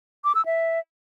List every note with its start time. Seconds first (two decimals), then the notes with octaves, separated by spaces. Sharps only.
0.24 D6
0.35 E6
0.46 E5